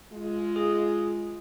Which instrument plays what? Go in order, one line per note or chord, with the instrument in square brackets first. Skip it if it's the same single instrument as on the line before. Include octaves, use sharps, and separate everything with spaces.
[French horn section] G#3 F4
[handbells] G#4